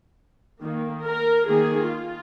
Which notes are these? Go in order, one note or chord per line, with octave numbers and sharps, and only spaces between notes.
D#3 A#3
A#4
D#3 A#3 G#4
F4